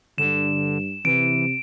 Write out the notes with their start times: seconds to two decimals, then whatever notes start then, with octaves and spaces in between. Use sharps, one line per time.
0.18 G2 D3 E7
1.05 C3 E3 D7